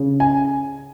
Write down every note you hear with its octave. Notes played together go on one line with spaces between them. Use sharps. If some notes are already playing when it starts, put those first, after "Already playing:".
Already playing: C#3
G#5